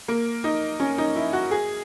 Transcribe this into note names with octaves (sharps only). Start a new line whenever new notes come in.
A#3
D#4
C#4
D#4
E4
F#4
G#4